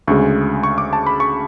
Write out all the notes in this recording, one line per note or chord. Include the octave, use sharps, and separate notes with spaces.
D2 C#3 G#3 C#6
C#6
D6
A5
B5
C#6